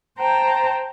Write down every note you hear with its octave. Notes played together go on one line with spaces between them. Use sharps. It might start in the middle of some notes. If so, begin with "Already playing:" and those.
C5 G5 A5 A#5